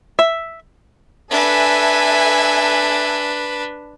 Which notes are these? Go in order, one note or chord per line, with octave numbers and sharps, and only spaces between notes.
E5
D4 A4 B4 E5 G#5